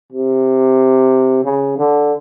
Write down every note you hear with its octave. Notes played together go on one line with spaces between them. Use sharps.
C3
C#3
D3